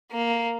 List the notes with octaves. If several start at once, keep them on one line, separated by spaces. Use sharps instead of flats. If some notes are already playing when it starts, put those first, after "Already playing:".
A#3